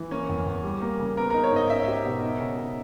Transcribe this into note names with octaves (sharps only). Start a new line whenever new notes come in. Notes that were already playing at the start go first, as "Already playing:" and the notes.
Already playing: E3
A#3 C#4
E2
E2
G3
A#3
C#3
B3 A#4
D#4 A#4
C#5
G#2 D#5
C#4 E5
G4
B2
D#4
C#3
C#3